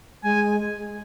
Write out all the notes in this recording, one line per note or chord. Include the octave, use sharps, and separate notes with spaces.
G#3 G#5